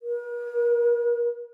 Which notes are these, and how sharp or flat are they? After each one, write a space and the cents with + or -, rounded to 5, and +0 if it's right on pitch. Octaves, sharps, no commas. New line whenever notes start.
A#4 +45